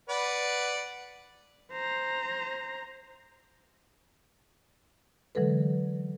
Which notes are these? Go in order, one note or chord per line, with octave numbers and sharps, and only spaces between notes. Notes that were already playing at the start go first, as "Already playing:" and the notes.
B4 D5 F#5
C5 A#5
D3 E3 F#3 G#3 A4 B4